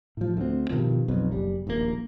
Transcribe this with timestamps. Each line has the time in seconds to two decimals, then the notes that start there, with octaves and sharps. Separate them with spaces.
0.17 A2 F3
0.37 D2 C4
0.70 G2 B2 D#3 F3
1.08 B1 F2
1.32 F#1 G3
1.67 D#1 A#1 A2 A#3